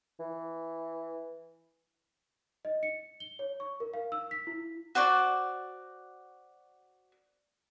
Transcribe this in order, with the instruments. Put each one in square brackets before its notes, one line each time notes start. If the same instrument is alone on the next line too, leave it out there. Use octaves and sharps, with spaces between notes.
[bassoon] E3
[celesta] D#5
C#7
G7
C#5
C#6
A#4
F5
E6
B6
E4
[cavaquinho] F#4 C5 D5 C#6